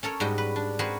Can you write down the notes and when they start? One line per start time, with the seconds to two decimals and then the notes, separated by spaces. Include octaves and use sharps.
0.03 C#4 A4 A#4 C#5
0.20 G#2 G3 F#4 D#5 G5
0.38 B4
0.56 D4
0.79 C4 F#4 G#4 A#4 B4